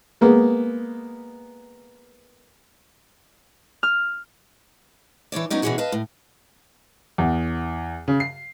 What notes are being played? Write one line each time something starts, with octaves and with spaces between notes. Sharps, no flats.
G#3 A#3 B3
F6
E3 D4 C#5 D5
F#3 B3 C#4 D#4 D5
B2 E3 C#4 D4 F#4 G#4
B4 D#5 F5 A5
A2
E2
C#3
C7